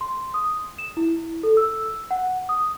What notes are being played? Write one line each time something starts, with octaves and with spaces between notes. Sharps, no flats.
C6
D#6
E7
E4
A4
E6
F#5
D#6